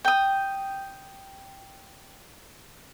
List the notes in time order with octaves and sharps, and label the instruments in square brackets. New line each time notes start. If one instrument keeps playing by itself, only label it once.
[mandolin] G5 D#6